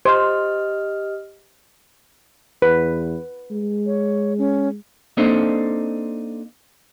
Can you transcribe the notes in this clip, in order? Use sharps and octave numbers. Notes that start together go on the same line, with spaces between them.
G4 C5 D#5 F6
E2 B4
G#3
C#5
C#4
A#3 C4 D4 D#4 A4 C5